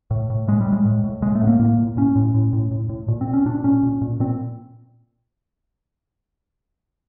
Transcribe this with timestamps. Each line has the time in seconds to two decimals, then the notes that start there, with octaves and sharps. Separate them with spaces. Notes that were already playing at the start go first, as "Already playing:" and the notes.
0.11 A2
0.30 A2
0.48 A2 G#3
0.61 G3
0.67 A2
0.72 G#3
0.85 A2
1.04 A2
1.22 A2 G#3
1.35 A3
1.41 A2 B3
1.47 A#3
1.59 A2 A#3
1.78 A2
1.97 A2 C#4
2.16 A2
2.35 A2
2.53 A2
2.71 A2
2.89 A2
3.08 A#2
3.21 C4
3.27 A#2
3.33 C#4
3.46 A#2 D4
3.64 A#2 C#4
3.83 A#2
4.02 A#2
4.20 A#2 C4